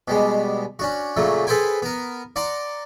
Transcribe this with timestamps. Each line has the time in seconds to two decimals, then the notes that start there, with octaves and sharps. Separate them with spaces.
0.08 B2 G3 G#3
0.79 C#4 D4 F#4
1.17 A#2 C#3 F#3 A3
1.47 G#4 A4 B4 C5 G5 G#5
1.82 B3 A#4
2.36 D5 F#5 A#5 C6 D6